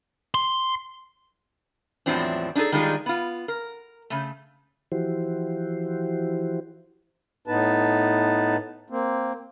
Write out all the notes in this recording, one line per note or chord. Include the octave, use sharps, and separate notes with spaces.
C6
E2 A2 F3 F#3 C4 D4
D4 D#4 F#4 G#4 A4
D#3 G3 G#3 D4 D#4 F4
B3 F4
A#4
C#3 A3
E3 F3 E4 F#4 G4 C5
A2 B3 D#4 B4 A5
A#3 C4